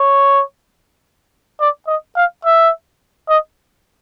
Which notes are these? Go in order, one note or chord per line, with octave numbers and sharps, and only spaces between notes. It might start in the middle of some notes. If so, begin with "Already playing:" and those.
Already playing: C#5
D5
D#5
F5
E5
D#5